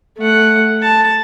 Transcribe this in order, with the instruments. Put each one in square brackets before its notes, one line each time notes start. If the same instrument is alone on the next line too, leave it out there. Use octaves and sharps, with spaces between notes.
[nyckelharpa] A3 F#5
A5